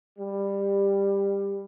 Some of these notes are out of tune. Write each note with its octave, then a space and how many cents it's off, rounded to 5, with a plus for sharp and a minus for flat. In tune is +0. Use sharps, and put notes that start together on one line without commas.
G3 +15